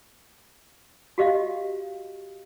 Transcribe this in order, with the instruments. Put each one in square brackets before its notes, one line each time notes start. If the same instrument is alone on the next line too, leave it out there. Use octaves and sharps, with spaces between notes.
[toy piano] F#4 G4 D#5 F5